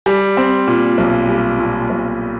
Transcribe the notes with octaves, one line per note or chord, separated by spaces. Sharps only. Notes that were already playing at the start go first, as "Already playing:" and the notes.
G3
C4
A#2
B1
G3
A#2
B1